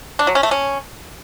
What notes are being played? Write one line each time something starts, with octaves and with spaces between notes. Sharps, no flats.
D4
F#3
C#4
A3
C#4